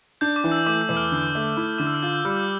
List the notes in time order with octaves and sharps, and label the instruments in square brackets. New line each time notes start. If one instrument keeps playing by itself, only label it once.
[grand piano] D4 [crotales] G6
[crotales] D6
[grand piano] E3
[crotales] E6
[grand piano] A3 [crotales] D6
[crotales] E6
[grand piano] E2
[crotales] F6
[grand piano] D3
A3
E4
[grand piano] D3 [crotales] D6
[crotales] E6
F6
[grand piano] F4 [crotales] G6
[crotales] G6
[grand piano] G3 [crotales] F6
[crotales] G6